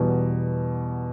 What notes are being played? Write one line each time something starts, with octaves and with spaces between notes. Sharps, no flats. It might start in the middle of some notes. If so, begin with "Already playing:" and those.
Already playing: E2 B2 G3